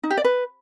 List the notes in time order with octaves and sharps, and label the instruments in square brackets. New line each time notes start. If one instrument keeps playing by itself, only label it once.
[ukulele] D#4
G4
D5
B4